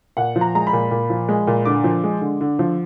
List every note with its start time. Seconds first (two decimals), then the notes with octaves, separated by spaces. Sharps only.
0.17 A#2 F#5
0.36 F3
0.41 A#5
0.55 G#3 A#5
0.67 B5
0.73 A#2
0.91 A#2
1.10 F3
1.29 G#3
1.47 A#2
1.65 D3 D6
1.84 F3
2.04 G#3
2.21 D3
2.41 D3
2.59 F3